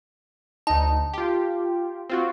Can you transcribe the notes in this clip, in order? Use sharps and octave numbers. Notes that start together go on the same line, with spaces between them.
D2 D#4 A5
F4 G4
C4 F4 F#4